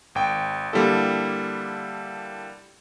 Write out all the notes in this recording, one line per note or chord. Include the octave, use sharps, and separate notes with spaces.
G#1 G5
D3 G3 A#3 E4 A4